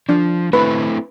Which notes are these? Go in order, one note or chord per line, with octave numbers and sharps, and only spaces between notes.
F3 D4
A3 C4 E4 B4